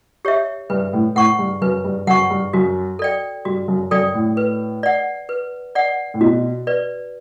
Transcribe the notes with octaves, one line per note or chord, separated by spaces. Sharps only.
G4 C#5 E5
G2 B4
A2
A2 F#5 C#6
G2
F#2 B4
G2
F#2 F#5 C#6
G2
F#2 F#4
A4 D5 G5
G2 F#4
F#2
F#2 A4 D5 G5
A2
B4
D5 F#5
B4
D5 F#5
A2
B2 F#4
B4 D5